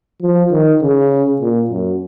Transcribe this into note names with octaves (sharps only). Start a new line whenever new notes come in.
F3
D#3
C#3
A#2
F#2